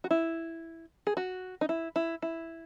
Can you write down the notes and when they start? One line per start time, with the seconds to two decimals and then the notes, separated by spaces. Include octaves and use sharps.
0.04 F#4
0.11 E4
1.07 G#4
1.17 F#4
1.61 D#4
1.69 E4
1.96 E4
2.22 E4